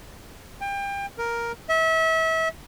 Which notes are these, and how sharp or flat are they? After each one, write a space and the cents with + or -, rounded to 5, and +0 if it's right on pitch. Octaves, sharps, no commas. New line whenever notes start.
G5 +30
A#4 +5
E5 -30